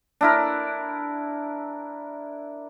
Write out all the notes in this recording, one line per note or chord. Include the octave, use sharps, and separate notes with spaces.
D4 E4 A#4